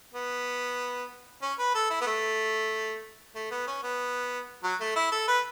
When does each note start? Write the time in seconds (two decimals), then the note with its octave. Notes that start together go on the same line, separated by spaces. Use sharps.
0.14 B3
1.42 C#4
1.59 B4
1.75 A4
1.90 E4
2.01 B3
2.06 A3
3.35 A3
3.51 B3
3.67 C#4
3.83 B3
4.63 F#3
4.80 A3
4.96 E4
5.12 A4
5.28 B4